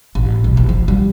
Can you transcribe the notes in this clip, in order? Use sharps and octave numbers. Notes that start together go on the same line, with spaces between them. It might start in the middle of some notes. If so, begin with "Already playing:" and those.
A1
B1
F#1
F3
G3